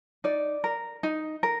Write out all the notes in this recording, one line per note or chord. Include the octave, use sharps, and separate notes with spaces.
D#4 D5
A#4
D#4
A#4